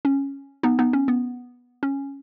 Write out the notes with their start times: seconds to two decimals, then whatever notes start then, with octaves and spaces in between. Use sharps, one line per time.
0.05 C#4
0.63 B3 D#4
0.79 B3 D#4
0.93 C#4
1.08 B3
1.83 C#4